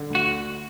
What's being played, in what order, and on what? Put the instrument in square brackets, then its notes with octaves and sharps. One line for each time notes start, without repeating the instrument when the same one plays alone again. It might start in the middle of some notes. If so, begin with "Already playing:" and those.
Already playing: [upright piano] D3
D2
[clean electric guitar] F#4